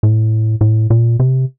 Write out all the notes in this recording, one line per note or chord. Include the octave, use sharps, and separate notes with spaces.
A2
A2
A#2
C3